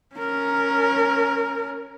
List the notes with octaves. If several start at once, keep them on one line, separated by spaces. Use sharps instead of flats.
C#4 A#4